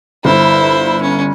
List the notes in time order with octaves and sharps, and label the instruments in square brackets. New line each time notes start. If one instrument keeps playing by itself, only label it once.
[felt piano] G1 [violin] E4 [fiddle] C5
[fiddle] C#4